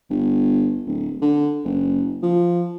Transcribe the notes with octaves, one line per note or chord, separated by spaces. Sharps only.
G1
D1
D3
F#1
F3